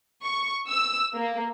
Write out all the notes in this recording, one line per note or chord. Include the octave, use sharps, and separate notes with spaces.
C#6
E6
A#3